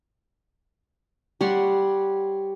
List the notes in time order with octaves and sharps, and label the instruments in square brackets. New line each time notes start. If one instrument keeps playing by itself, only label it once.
[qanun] G3 C#5 F#5 C6